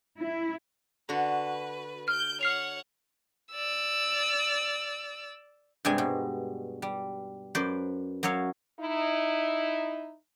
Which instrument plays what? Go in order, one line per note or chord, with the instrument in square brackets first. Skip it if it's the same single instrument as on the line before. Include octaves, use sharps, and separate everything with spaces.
[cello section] E4
[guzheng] D3 F#4 [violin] B4
[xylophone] F6 [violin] G6 D7
[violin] C#5 F#5 [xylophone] F6 C7 F7
[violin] D5 E6
[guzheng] G2 C3 G3 G#3 G#5 B5
B2
G3
F#2 B4 C5 D5
F#2 F#3 C#5 E5 F5
[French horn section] D#4 E4